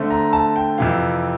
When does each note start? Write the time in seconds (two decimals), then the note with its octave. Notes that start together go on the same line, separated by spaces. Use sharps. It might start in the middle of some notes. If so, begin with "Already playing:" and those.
Already playing: D3 A3 C4
0.10 A#5
0.33 A5
0.56 G5
0.78 F2 C3 E3 F5